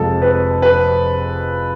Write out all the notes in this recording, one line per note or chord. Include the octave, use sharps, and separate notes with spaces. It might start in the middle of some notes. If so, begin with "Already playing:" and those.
Already playing: F1 F2 F3 G#3 A4
B4
B4